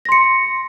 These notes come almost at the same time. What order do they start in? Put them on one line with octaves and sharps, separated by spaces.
A#6 C6 C#7